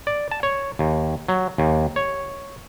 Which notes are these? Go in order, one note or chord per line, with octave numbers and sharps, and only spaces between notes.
D5
A5
C#5
D#2
F#3
D#2
C#5